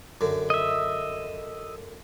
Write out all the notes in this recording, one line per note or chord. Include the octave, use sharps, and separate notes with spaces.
F#2 D3
D#5 E5